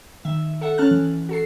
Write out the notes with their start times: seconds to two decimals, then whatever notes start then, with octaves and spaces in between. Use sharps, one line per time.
0.25 D#3 E5
0.61 A4 E5 F#5
0.78 C#4 A5 F6 F#6
0.91 E3
1.29 F#4 A4 C7